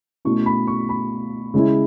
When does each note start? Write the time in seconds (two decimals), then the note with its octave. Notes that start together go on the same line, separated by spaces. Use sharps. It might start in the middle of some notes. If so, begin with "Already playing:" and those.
0.25 B2 A3 C#4 E4 C#6
0.46 B5
0.67 C#6
0.89 B5
1.54 C#3 G#3 C#4 E4